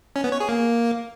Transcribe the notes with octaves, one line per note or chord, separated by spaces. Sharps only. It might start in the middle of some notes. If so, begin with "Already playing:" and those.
C#4
B3
C#5
G#4
A#3